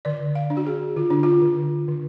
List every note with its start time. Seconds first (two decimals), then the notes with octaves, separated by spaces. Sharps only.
0.05 D3 D5
0.35 F5
0.50 D4
0.57 F#4
0.66 G#4
0.96 D3 F4
1.10 D4
1.23 F4
1.42 D3
1.88 D3